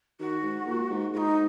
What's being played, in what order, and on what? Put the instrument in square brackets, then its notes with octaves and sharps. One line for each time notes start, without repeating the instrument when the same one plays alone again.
[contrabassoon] D#3 [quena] F#4
[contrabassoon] G#2
A#2
G#2
[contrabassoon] G#2 [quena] D#4 F#4